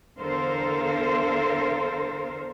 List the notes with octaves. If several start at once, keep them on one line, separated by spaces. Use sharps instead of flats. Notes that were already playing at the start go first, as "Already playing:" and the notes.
E2 D3 A4 A#4 C5 F5